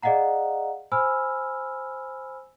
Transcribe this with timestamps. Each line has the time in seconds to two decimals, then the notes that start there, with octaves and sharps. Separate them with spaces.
0.03 G#4 D5 D#5 F5 F#5 A#5
0.92 C5 G#5 B5 E6 F6